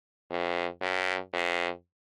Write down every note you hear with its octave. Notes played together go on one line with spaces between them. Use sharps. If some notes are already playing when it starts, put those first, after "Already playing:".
F2
F#2
F2